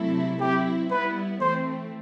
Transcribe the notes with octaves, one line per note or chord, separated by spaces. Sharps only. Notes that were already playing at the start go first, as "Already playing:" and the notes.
Already playing: C3 F#3 A3 E4 A4
F#3 C4 E4 G4
G3 B3 E4 B4
E3 A3 C4 C5